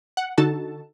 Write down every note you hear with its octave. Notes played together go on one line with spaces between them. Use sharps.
F#5
D3 D#4 F#4 A4 A5